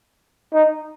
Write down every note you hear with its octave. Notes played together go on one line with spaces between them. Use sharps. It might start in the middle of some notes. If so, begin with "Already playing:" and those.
D#4